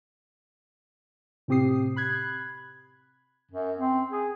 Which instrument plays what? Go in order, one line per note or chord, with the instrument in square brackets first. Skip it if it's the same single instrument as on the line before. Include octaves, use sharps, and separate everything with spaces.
[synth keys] A2 C3 C4 G4 D#6 C7
B5 F#6 G#6
[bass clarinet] F#2
C4
G#4